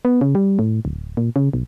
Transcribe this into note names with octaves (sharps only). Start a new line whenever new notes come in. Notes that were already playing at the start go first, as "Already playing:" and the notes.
B3
C#3
G3
A2
D1
A#2
C#3
B1